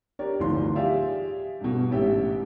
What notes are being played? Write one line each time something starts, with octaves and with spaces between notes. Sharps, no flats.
D4 G4 A#4 C#5 D5
D1 G1 E3 F3 D#4 C6
G4 G#4 D5 E5 F5 G5
G2 B2
A1 G#2 C#4 G4 E5 G5